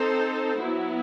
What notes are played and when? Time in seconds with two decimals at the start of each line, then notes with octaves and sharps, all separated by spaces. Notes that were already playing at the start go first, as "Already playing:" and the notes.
Already playing: C4 D#4 A4 C5
0.57 F#3 B3 E4